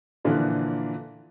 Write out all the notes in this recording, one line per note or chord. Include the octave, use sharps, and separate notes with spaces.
A#2 D3 E3 F3